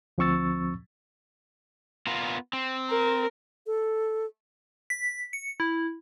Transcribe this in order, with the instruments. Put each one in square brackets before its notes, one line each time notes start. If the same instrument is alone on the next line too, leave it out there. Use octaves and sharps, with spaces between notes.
[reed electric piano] D2 F3 C4 C#6 E6 A6
[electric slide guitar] B3 F4 A#4
C4
[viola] A#4
[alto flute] A4
[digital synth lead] B6
C#7
E4